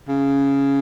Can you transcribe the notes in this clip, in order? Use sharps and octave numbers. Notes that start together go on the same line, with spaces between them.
C#3